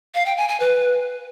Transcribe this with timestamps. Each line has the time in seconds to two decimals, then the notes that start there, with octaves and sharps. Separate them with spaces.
0.15 F5
0.26 G5
0.37 G#5
0.49 G#5
0.60 B4